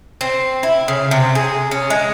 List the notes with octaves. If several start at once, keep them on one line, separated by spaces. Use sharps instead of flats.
C4
E4
C#3
C3
G#4
C#4
G#3